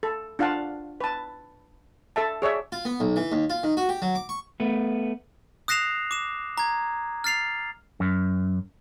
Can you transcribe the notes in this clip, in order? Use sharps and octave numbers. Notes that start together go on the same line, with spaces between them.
A4
D4 F4 F5 F#5 A5
B4 A5
A4 E5 A5
G#4 C#5 D5 E5
F4
B3
B1
E3
D#2
F4
D#3
F#4
G4
F#3
D6
C#6
A3 B3
D#6 F#6 A#6 C7 E7 F7
D6 E7
A#5 G#6
F6 A6 C7 F7
F#2